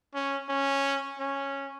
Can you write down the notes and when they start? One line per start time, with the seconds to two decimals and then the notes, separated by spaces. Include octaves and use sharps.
0.14 C#4
0.49 C#4
1.19 C#4